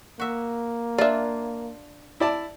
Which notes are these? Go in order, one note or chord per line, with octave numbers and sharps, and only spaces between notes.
A#3 F#4 E5
D4 F4 D5 E5
E4 D5 A5